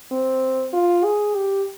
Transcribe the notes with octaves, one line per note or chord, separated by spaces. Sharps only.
C4
F4
G#4
G4